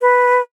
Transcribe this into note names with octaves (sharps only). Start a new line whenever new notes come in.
B4